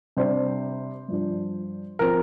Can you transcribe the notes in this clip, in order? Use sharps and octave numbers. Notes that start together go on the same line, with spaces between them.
C3 G3 D4 C5
G2 F3 D4
F3 C4 A#4